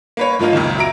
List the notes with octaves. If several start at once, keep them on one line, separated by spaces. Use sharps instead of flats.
A#3 B4 C#5
G#2 F3 A#3 D#4 F4
C#2 F#2 A#2 D#3
F#3 E5 A#5 D7